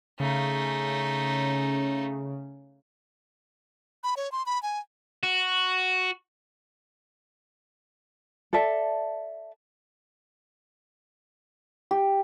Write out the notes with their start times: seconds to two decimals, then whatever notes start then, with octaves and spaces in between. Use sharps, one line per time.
0.20 C#3 A3 D#4
4.04 B5
4.17 C#5
4.32 C6
4.46 B5
4.63 G#5
5.23 F#4
8.53 A4 D5 E5 A5
11.91 G4